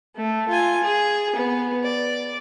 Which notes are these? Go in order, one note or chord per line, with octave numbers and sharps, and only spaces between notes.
A3
F4 G#5
G#4
B3
D5